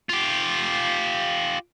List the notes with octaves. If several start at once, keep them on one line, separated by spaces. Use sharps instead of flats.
F4 G4